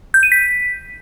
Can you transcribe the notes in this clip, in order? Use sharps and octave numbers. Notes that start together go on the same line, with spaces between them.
G6
D#7
B6